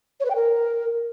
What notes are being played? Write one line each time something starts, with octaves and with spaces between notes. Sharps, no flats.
C#5
B4
G5
A#4